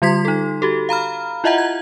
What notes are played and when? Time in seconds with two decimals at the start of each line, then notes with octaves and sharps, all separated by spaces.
0.02 D3 G3 F4 C6 G#6 B6
0.25 D#4 A4
0.62 F#4 G4 A4
0.89 F5 A#5 B5 F6
1.44 E4 F4 D#5 E5 F#5 A#5
1.58 G#6